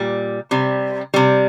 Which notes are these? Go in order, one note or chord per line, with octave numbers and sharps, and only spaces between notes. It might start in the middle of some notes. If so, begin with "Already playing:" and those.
Already playing: A#2 G3
C3 G3
C3 G3